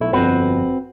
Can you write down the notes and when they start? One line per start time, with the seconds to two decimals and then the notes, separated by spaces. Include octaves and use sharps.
0.01 B1 A3 E4
0.13 G1 F2 C4 F#4 B4